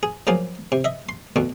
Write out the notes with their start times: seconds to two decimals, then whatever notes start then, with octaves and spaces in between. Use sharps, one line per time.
0.03 G#4
0.27 F3 F#3 A#3 F4 G#4
0.72 C3
0.84 D#5 E5
1.09 C6
1.36 D2 B2 D3